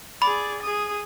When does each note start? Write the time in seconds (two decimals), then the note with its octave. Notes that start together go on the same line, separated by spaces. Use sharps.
0.22 G#4 D5 B5
0.62 G#4 D#6